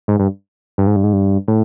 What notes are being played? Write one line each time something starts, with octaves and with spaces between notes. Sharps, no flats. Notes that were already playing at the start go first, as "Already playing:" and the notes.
G#2
G2
G2
G#2
G2
G#2
G2
A2